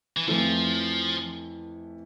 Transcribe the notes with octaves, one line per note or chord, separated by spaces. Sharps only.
E3
F2 E3 F3 A3 E4